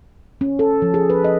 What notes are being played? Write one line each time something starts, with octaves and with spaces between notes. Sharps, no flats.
C#4
A4
F3
G#4
B4
D#5